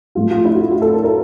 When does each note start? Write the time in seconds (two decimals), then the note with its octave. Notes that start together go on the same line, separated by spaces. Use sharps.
0.15 A2 F3 A3 F4
0.31 F4
0.45 E4
0.55 F#4
0.61 F4
0.71 F#4
0.82 A4
0.93 A#4
1.04 A#4